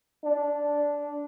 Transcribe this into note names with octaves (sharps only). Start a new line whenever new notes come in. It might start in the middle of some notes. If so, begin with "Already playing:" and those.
D4